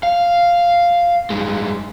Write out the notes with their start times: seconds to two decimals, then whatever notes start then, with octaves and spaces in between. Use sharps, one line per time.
0.03 F5
1.30 G2 G#3